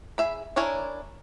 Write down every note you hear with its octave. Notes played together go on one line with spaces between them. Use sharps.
G#4 E5 B5
D4 E4 A#4 C#5 G#5